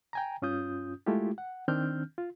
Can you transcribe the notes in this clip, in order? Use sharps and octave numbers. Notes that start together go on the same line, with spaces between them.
G5 G#5 A#5
G2 C#4 F4 D#6 G6
G#3 A3 E4 F4 G4
F#5
D#3 C4 D4 F6 G6
F4